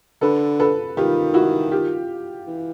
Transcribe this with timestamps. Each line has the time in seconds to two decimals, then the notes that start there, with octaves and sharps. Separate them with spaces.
0.21 D3 A4 B4
0.59 A4 B4
0.97 D#3 F4 G4
1.34 E4 F#4
1.71 F4 G4
2.47 E3